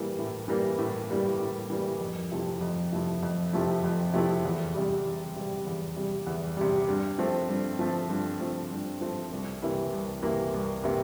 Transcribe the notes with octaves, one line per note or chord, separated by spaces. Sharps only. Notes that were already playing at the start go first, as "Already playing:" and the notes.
Already playing: A2 E3 G3 A#3
A2
E3 G3 A#3
A2
E3 G3 A#3
A2
E3 G3 A#3
F2
C3 F3 A3 E4
F2
C3 F3 A3 E4
F2
C3 F3 A3 E4
F2
C3 F3 A3 E4
E2
C3 G3
E2
C3 G3
E2
C3 G3
E2
C3 G3
G2
F3 A3 C4
G2
F3 A3 C4
G2
F3 A3 C4
G2
F3 A3 C4
C2
C3 E3 A#3 E4
C2
C3 E3 A#3 E4
C2
C3 E3 A#3 E4